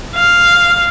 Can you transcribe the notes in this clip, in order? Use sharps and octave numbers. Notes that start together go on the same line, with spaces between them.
F5